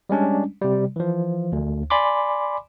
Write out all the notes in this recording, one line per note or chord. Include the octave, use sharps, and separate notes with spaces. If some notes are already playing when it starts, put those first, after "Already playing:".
G3 G#3 C#4 D4
C3 G3
E3 F3
D2
D5 G#5 B5 C6 D6